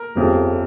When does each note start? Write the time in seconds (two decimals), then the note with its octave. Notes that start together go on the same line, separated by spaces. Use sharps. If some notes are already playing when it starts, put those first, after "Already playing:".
Already playing: A#4
0.15 G1 F2 C#3 G3